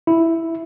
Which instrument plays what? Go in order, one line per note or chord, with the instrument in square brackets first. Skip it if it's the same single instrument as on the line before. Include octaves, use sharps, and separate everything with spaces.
[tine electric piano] E4